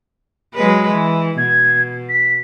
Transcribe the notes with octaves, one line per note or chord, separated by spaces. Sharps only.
F#3 G#3 B4
E3
B2 G#6
B6